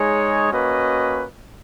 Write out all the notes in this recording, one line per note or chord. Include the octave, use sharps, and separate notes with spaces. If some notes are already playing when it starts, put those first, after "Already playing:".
Already playing: G#3 D#4 G#4 C#5
A#3 C#4 F#4 B4 D#5